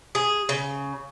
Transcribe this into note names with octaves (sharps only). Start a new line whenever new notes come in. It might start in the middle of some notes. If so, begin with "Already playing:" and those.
G#4
C#3